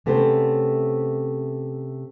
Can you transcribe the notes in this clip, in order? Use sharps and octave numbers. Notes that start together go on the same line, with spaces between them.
C3 A3 B3 C#4 A4 C5